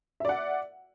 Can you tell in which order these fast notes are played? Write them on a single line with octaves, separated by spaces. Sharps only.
E5 D5 F#5